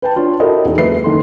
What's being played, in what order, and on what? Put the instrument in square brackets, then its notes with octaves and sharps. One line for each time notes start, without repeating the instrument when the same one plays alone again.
[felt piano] B4 G5 A5
D4 F4 C#5
E4 F#4 G4 A4 A#4 D#5
E2 D#4 A4
F#1 G#3 B4 E5 C7
F#1 D#3 A4 C6